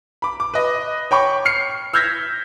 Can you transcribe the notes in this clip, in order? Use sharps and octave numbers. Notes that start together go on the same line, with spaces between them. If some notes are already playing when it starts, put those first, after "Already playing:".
B5 D6
D6
B4 D#5
C#5 G5 B5 C#6 D6
F6 C7 C#7
E6 F6 G6 G#6 A#6 B6